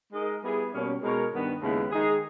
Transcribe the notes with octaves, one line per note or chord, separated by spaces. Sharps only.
G#3 D#4 A#4 D#5
G3 B3 E4 G#4
B2 G3 A#3 C#4
B2 G#3 D#4 A#4 C#5
G2 D#3 G3 B3
D#2 C#3 G#3 B3 E4
D#3 G#3 D#4 G#4